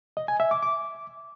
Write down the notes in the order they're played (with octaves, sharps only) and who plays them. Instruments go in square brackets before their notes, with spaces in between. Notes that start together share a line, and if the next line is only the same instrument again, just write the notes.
[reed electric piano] D#5
G#5
E5
D6
D6